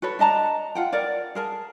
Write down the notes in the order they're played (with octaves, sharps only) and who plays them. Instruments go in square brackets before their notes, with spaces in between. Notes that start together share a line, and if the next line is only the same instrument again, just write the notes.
[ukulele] F#4 A4 B4 C#5
D4 D#5 A5 A#5
F4 F#5 G5
A#4 C#5 D5 F#5
G#4 A#4 A5